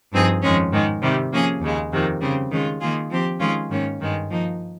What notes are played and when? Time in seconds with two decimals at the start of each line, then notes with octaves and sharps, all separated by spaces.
0.12 G2 F3 C4 D#4 G#4
0.42 F2 D#3 G#3 C#4
0.72 G#2 D#3 G#3
1.02 C3 D#3 G3
1.32 F3 A#3 C#4 G#4
1.61 D#2 C#3 G#3
1.91 F2 C3 D#3 A#3
2.21 C#3 G3 C4
2.51 D#3 G#3 C#4 F4
2.81 D#3 A#3 F4 G#4
3.10 F3 C4 G4
3.40 D#3 G#3 C#4 F4 G#4
3.70 G#2 D#3 A#3 C#4
4.00 G2 D#3 G#3
4.30 F3 A#3 D#4